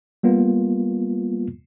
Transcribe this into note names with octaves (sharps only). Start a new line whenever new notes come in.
G3 A#3 B3 F4